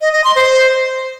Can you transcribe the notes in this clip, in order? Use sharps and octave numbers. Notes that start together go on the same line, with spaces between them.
D#5
D#5
C6
C5